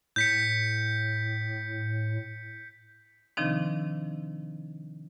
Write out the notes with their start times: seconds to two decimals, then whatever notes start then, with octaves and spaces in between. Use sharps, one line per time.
0.16 A2 G6 B6 C#7
3.37 C3 D#3 F3 C4 D4 D#4